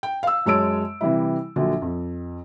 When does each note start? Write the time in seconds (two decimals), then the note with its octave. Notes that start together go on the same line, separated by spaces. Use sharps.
0.03 G5
0.23 F5 E6
0.46 F#2 G#3 C#5 A5 E6 D7
1.01 C3 E3 G3 E4
1.56 A#1 D3 F#3
1.82 F2